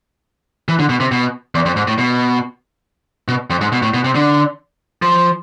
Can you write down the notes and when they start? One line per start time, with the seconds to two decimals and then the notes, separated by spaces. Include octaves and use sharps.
0.68 E3
0.79 D3
0.89 B2
1.00 C3
1.12 B2
1.55 E2
1.66 F2
1.77 G#2
1.87 A2
1.99 B2
3.28 B2
3.50 F2
3.61 G#2
3.72 B2
3.82 A2
3.94 B2
4.04 C3
4.15 D3
5.02 F3